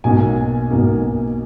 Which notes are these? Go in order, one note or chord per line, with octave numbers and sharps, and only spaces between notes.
B1 B2 A#3 G#5
B1 B2 A#3